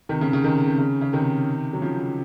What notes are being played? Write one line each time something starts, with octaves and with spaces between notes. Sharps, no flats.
C3 D#3
C#3
C#3
C3 D#3
C3
C#3
C#3
C3 D#3
F#3
C#3 F3